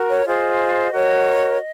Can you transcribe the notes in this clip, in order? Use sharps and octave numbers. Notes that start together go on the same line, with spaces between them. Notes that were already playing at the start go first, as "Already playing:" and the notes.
Already playing: F#4 A#4
C#5
F4 G#4 C5 D#5
F#4 A#4 C#5